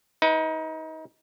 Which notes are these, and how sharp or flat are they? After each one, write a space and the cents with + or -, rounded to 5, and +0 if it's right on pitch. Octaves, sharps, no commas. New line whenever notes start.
D#4 +30 B4 +0